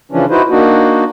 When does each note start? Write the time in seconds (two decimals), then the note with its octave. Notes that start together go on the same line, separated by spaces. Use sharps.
0.12 C#3 E3 F3 C#4 D4
0.30 D#4 E4 F#4 B4 C5
0.50 A#3 D4 D#4 F#4